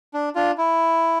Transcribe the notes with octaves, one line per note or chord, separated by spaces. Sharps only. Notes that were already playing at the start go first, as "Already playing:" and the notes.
D4
D4 F4
E4